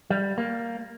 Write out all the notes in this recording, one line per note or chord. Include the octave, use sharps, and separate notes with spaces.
G3
A#3